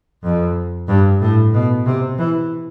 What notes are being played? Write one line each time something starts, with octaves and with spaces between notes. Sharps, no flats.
F2
G2
A2
B2
C3
E3